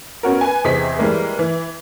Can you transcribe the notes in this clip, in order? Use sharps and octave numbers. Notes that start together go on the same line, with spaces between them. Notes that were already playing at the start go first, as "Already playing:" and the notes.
B3 C#4 F#4 A#4
B4 G#5
E2 C3 G#4 C5 D#5 B6
E3 G3 G#3 A#3
E3